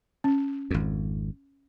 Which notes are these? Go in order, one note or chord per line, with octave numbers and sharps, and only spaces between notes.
C#4
G#1 F2